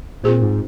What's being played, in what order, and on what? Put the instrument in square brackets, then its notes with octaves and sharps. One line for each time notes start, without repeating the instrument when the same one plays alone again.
[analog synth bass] A#2 [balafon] C4 F4 G#4 C5
[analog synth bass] G#2